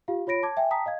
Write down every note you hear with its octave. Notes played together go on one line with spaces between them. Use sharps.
F4 G4 F5
F4 C#5 B5 A#6 D7
A5 D6 G#6
E5 G5 G#5
G5 A5 A#5 D#6 B6
D#5 F5 G#6